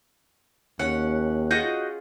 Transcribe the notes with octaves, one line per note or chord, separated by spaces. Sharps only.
D#2 C#4 F#5
F4 F#4 G#4 D#5 F#5 G6